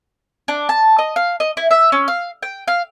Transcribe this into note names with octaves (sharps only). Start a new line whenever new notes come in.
D4
A5
D#5
F5
D#5
E4
E5
C#4
F5
G5
F5